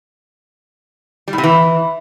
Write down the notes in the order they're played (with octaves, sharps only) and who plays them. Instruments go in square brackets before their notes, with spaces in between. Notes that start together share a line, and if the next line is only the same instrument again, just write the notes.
[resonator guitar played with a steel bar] G3
A2
C3
E3